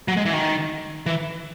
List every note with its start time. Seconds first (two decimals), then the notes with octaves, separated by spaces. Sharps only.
0.08 F#3
0.17 G#3
0.25 E3
0.33 D#3
1.06 E3